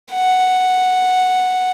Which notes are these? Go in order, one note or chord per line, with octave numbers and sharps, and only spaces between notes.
F#5